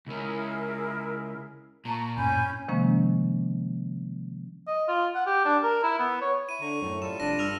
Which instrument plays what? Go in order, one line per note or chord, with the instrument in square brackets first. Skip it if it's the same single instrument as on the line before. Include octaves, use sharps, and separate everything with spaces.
[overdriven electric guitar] C#2 C#4 [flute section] E4 G#4 A#4
[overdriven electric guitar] A#2 [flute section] A5 A#5 C#6
[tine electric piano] C#2 F#2 A2 [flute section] C#4 B5 G6 [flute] G#5
[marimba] C3 D#3 F3 G#3 A#3 C#4
[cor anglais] D#5
F4
F#5
G4
D4
A#4
E4
B3
C#5
[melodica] E4 [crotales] D#7
[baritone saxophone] D3 [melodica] A#5 C#6
[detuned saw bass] F#2 [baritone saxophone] A2
[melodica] G3 F4 A4 [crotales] E7
[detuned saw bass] F1 [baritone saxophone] D4 [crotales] A#6 D#7
[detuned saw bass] G2 [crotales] E6 F6 F7